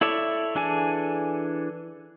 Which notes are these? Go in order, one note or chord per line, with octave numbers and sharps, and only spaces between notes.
E4 A4 C#5 D5 E5
E3 D4 G#4 A4 G#5